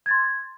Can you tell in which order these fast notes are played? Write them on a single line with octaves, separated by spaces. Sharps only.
G#6 A6 C6